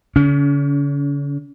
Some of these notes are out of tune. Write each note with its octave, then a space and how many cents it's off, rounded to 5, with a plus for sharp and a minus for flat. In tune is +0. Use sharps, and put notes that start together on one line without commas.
D3 -45 C#4 +35